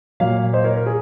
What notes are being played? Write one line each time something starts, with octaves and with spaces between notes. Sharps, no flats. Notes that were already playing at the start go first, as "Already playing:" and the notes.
A#2 F#3 A#3 C#5 F5
C5 D#5
A#4 C#5
A#4
G#4